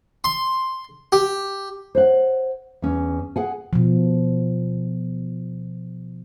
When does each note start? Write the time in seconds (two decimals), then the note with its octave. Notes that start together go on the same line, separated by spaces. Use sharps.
0.24 C6
1.12 G4
1.95 C5 C#5 F#5
2.82 E2 C#4
3.36 G#4 F#5 G#5
3.73 B2 F3